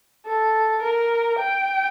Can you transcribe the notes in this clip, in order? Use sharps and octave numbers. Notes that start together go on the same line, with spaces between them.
A4
A#4
G5